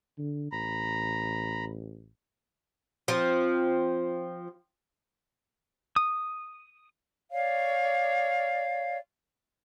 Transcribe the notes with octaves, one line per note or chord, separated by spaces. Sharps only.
D3
A1 A#5 B5
F3 C4
D#6
C#5 D5 F5